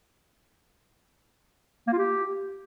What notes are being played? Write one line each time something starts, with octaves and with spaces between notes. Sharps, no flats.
A#3
F4
G4